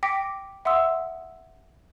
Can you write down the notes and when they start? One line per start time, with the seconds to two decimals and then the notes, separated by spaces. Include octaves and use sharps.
0.03 G5 D6 A#6 B6 C#7 D7
0.65 E5 F#5 C6 D#6 E6